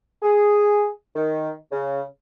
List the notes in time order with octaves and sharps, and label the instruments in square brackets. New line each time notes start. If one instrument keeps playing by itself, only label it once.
[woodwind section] G#4
D#3
C#3